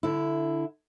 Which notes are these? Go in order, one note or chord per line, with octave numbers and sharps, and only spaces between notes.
D3 E4